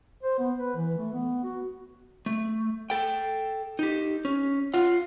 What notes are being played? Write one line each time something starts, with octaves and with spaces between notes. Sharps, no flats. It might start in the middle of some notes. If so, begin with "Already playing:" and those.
C5
B3
B4
E3
A3
B3
F#4
A3
A4 G5
D#4 G4
C#4
F4 F#5